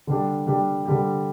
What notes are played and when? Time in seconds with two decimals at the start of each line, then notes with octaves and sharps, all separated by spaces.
0.07 D3 G3 D4 G4
0.46 D3 G3 D4 G4
0.85 D3 G3 D4 G4